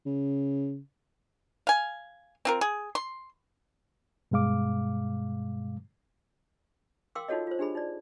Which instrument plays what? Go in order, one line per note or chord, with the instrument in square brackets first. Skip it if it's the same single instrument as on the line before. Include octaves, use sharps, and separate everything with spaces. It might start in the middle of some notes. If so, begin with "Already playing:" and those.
[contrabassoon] C#3
[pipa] F5 G#5
C4 F4 A#4
G#4
C6
[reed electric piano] G2 B2 G#3 F5 D6
[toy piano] A#4 F5 G5 C6 D6 E6
D#4 F4 F#4 A4 C#5 D#5
F4 C5
D4 G4 G#4 B5
D#4 D5